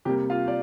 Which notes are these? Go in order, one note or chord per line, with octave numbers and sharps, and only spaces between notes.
C3 G3 A#3 G4 G5
F4 F5
D5